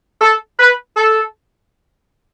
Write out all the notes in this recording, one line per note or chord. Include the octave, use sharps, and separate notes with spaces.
A4
B4
A4